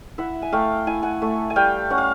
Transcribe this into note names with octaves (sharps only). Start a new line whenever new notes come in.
E4 E5 F#5
G#5
A3 F5 G5
E4 G#5
F#5 G#5
A3
G#5
G3 F5 G5
C#4 F#5
F5